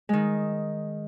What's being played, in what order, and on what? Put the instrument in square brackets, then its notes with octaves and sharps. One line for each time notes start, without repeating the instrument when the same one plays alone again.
[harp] D#3 G#3